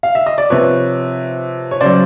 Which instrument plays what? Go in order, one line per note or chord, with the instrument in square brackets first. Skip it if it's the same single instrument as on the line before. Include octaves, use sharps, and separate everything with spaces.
[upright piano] F5
E5
D#5
D5
C3 F3 B4 C#5
C#5
C#3 F#3 C5 D5